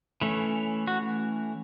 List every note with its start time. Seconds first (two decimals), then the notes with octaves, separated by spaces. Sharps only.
0.22 E3 A3 C#4
0.87 F#4